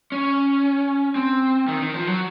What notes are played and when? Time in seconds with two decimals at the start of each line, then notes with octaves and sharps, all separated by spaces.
0.12 C#4
1.16 C4
1.68 D#3
1.81 D#3
1.95 F3
2.07 F#3